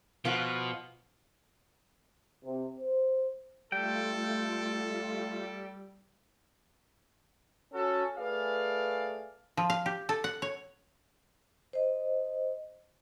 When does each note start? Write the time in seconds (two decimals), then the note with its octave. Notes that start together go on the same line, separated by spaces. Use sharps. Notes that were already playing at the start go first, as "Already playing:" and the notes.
0.25 B2 F3 B3 F4
2.45 C3
2.80 C5
3.72 G3 A3 F4 A4 G5
7.74 C#4 F#4 A4
8.17 A3 G#4 B4 D5 F5
9.57 F3
9.70 F5
9.86 G4
10.09 A4
10.24 F#5
10.42 C#5
11.73 C5 D#5